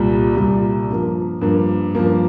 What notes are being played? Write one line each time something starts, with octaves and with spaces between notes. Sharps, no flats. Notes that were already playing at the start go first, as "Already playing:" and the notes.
Already playing: C2 A#2 G3
C2 A#2 G3
G2 F3 A#3
G2 F3 A#3
G2 F3 A#3